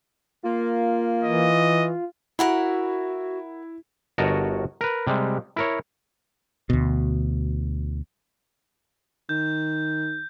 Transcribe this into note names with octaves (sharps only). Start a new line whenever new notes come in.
A#3 F4
E3 D#5
E4 F#4 A#4 F#5 B5
G1 F#4 A#4 C#5 D#5 A5
A#4 B4
C3 G3 G#3
E4 A#4 C#5
D2 B2
D#3 G6